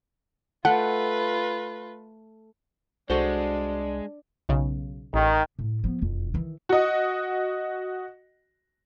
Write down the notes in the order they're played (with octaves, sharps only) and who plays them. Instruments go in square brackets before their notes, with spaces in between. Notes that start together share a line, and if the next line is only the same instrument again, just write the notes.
[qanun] A3 [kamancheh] F4 B4 [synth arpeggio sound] F#5
[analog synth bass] C2 [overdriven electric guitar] G#3 [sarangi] D4 [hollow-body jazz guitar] F#4 A4 C5
[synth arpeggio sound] B1 C#3
[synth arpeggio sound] A1 [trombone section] D#3
[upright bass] A2
F3 B3
E1 F2
D#3 E3
[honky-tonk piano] F#4 D#5